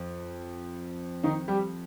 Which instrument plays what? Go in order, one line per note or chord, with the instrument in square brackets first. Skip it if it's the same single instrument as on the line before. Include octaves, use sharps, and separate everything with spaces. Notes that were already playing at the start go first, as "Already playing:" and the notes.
Already playing: [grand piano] F2
D#3 D#4
G3 G4